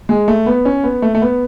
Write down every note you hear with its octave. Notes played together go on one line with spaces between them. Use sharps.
G#3
A3
B3
C#4
B3
A3
A3
B3